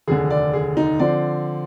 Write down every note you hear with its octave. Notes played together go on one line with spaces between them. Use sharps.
F1 D#2 D3 G#4
D5
G#4
D#4
D3 F3 C4 D5